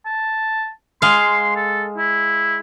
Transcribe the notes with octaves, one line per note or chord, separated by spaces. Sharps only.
A5
G#3 F5 C6
A4
E4